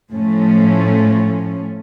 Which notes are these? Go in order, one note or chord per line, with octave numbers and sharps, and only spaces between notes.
A2 F3 A3 C#4